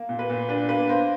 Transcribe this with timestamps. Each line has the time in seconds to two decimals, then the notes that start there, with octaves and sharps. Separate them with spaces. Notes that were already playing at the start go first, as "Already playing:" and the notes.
Already playing: A#3
0.09 A#2
0.19 B4
0.30 A#2
0.49 D4 B4
0.69 A#3 B4
0.89 A#3 C5